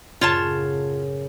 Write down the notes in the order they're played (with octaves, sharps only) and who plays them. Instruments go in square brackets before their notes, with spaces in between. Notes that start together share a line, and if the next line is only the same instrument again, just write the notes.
[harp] F#2 A2 C#3 [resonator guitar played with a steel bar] F4 C#5 A5